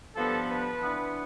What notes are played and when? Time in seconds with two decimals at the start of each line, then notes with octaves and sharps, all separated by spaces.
0.16 G2 F3 B3 D4 A4
0.48 B4
0.81 E3 B3 D4